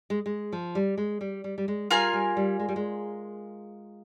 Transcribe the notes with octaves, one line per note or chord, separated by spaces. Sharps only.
G#3
G#3
F3
G3
G#3
G3
G3
G3
G#3
G3 F4 A#4 F5 G#5
G3
G3
G#3
G3
G#3